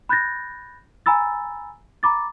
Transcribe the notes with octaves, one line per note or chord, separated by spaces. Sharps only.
B5 F#6 G6 A6 A#6
G#5 A#5 B5 E6 A6
A#5 B5 D6 A6